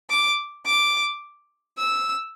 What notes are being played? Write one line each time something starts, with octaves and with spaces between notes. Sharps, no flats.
D6
D6
E6